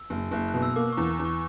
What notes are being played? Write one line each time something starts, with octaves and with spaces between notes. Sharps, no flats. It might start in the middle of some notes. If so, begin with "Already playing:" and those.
Already playing: E6
F#1
F#1
F#6
B2
E6
A#3 D6
E2 C#6
E2
C#6